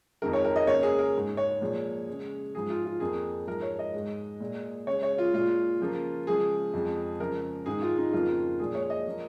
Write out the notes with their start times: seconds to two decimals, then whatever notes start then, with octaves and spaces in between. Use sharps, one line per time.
0.22 F2 D#3 G#3 A#4
0.33 C#5
0.45 A#4
0.56 D#5
0.67 C#3 A#3 C#5
0.83 G#4
0.99 A#4
1.15 G#2 G#3
1.37 C#5
1.61 A#2 F3 G#3
2.08 C#3 G#3
2.54 G#2 F3 G#3 G#4
2.70 F4
2.85 F4
3.00 F2 F3 A#3 G#4
3.47 G#2 F3 G#3 A#4
3.62 C#5
3.79 D#5
3.94 G#2 G#3
4.41 A#2 G#3
4.87 C#3 G#3 C#5
5.03 C#5
5.18 F4
5.34 A#2 G#3 F4
5.80 C#3 F3 A#3
6.27 C#3 F3 G#3 G#4
6.73 F2 F3 G#3
7.19 C#3 F3 G#3 A#4
7.66 G#2 D#3 G#3 G#4
7.82 F4
7.98 D#4
8.13 F2 C#3 F3 A#3 F4
8.59 A#2 F3 G#3 G#4
8.75 C#5
8.90 D#5
9.07 F3 A#3